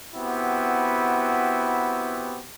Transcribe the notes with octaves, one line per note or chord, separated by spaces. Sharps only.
B3 C4 E4 F#4 G4